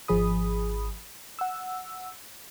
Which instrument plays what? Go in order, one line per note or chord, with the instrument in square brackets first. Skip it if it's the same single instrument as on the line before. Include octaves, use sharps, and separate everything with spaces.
[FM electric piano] G#1 F3 G#4 B5 D#6
F#5 E6